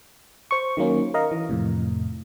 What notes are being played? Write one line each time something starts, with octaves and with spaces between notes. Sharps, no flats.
C5 C#6
D#3 F#3 A#3 C#4
A#4 D#5 F5 A#5
E3
F2 A2 C3